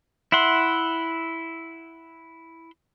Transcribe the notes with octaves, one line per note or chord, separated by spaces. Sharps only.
E4 E5 F#5 C6